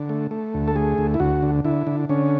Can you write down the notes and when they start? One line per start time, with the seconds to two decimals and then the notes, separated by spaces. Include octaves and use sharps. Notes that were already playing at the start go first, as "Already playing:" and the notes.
Already playing: D3
0.09 A3
0.31 A3
0.54 D2
0.68 A4
0.76 A3 G#4
0.98 D2
1.14 E4
1.20 D2 F#4
1.42 D3
1.65 D3 E4
1.87 D3
2.09 D3 C#4